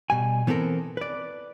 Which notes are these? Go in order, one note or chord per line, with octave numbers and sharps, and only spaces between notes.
B2 G3 G#5
E3 B3 C4 A4 A#4
B4 D5